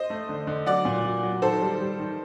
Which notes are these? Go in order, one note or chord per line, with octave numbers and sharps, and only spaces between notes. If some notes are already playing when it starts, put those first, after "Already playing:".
Already playing: C5 D#5
A3
D3
D3
F#3 D5 F#5
A#2
F#3
F#3
D#3 A4 C5
G3
G3
D#3